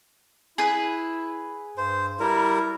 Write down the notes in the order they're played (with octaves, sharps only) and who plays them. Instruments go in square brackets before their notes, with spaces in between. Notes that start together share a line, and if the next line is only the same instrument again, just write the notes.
[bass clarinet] E4 [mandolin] G#4 B4
[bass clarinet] G2 [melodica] C5
[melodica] G3 A#4 [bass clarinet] E4